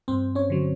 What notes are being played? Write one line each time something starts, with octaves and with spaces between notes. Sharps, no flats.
G2 C4 C5
C#4 C#5
D3 F#3